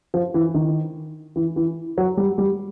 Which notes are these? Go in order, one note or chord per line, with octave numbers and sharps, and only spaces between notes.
F3
E3
D#3
E3
E3
F#3
G3
G3